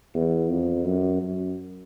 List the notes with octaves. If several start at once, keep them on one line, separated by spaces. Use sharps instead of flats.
E2
F2
F#2
F#2